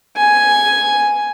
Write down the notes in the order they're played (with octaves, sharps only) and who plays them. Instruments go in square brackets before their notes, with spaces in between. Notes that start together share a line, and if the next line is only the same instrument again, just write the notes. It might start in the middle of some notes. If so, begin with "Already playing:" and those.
[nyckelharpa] G#5